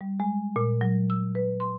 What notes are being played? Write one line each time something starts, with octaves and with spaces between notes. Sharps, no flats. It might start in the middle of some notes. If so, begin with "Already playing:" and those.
G3
G#3
A#2
F#3
E6
B4
C6